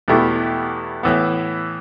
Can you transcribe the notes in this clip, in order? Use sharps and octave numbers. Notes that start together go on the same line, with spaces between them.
E2 B2 A3 E4 G4
A2 E3 B3